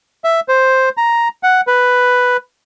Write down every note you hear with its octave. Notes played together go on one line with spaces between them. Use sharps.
E5
C5
A#5
F#5
B4